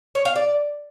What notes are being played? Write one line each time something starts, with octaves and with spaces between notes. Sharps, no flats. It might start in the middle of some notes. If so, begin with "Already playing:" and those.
C#5
F5
D5